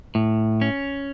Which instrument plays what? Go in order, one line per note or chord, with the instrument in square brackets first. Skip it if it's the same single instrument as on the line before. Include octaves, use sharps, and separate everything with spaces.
[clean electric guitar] A2
C#4